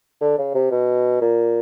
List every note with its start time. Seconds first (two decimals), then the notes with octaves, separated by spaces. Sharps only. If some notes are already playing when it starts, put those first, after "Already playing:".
0.21 D3
0.38 C#3
0.54 C3
0.71 B2
1.22 A#2